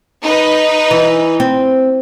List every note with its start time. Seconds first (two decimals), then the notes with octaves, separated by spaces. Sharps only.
0.23 D#4 B4
0.91 E3
1.40 C4